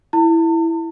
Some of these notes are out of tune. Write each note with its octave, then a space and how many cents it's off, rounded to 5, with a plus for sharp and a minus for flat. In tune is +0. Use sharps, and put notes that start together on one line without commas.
E4 +0 A5 +40